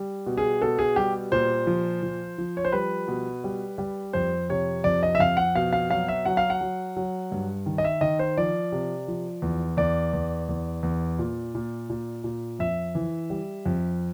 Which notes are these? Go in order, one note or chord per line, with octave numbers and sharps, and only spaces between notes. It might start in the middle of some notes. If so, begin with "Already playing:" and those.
Already playing: G3
B2
G#4
B2 A4
G#4
G3 G4
A#2 C5
F3
F3
F3
C#5
C5
G3 B4
B2
G3
G3
F2 C5
C3 C#5
F2 D5
D#5
E5
F2 F5
F#5
B2 F5
F5
F#3 F5
E5
F#3 F#5
F5
F#5
F#3
F#3
G2
D#3
D#5
E5
D#3 D#5
C5
F3 D5
C3
F3
E2
E2 D5
E2
E2
E2
A#2
A#2
A#2
A#2
F2 E5
E3
G3
F2